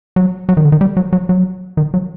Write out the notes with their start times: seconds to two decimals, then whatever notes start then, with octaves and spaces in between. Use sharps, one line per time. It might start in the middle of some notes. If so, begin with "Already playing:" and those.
0.16 F#3
0.49 F#3
0.57 D#3
0.65 D3
0.72 D#3
0.81 G3
0.97 F#3
1.13 F#3
1.29 F#3
1.77 D#3
1.94 F#3